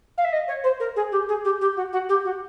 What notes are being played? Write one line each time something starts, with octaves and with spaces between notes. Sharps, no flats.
F5
E5
D#5
C#5
C5
A#4
G#4
G4
G#4
G4
G4
F#4
F#4
G4
F#4